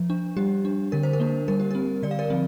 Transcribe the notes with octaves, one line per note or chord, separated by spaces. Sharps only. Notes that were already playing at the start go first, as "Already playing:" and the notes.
Already playing: F3
D4
G3 G4
D4
D3 A#4
C5
A#4
A#3 D4
G3 A#4
G4
C4 A#4
D3 D5
F5
A#4 D5
F3 C4